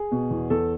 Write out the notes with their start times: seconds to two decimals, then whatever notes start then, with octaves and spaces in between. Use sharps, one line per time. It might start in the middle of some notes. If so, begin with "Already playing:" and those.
Already playing: G#4
0.12 B2
0.31 E2
0.50 E2 A4